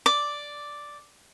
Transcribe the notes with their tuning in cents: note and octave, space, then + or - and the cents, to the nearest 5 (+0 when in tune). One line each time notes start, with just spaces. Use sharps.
D5 +0 D6 +0